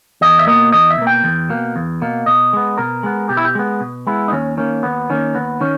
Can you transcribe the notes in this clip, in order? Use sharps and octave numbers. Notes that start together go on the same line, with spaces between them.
E2 D#5
E5
B2 A#3 D#5
E2 D#5
E5
B2 A#3
G5
E2
B2 A#3
E2
B2 A#3
B2 D#5
G#3 B3
B2 A#4
G#3 B3
B2 G4
E4
G4
G#3 B3
B2
G#3 B3 E4
D#4
D#2 C#4
D#3 A#3 C#4
D#2 B3
D#3 A#3 C#4
D#2 B3
D#3 C#4